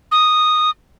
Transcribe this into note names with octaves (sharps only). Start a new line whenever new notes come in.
D#6